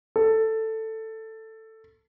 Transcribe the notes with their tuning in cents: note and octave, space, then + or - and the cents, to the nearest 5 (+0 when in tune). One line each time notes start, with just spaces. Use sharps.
A4 +10